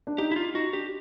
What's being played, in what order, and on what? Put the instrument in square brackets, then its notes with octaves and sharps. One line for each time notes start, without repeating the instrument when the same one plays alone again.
[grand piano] D4
[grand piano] D#4 [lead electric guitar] G4
[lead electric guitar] E4
F4
[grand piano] D#4 [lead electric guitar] F#4
[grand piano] D4 [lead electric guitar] G4